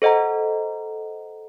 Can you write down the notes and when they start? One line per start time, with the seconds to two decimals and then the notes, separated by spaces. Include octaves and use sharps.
0.02 A4 C5 D#5 F#5 A#5